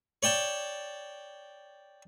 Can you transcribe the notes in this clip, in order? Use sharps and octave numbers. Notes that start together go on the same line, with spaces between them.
C#5 D5 G5 A5